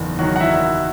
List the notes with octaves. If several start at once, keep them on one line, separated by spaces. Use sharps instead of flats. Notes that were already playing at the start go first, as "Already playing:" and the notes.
Already playing: F#1 E2 D#3
D#3 F#3 F#4
F#5
E4 E5